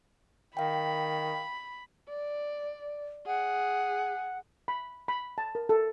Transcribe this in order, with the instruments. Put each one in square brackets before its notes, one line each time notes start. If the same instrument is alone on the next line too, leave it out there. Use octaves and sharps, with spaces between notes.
[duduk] D#3 [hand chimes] F5 G5 [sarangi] B5
[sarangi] D5
[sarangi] G#4 [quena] F#5
[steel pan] B5
B5
A5
A#4
A4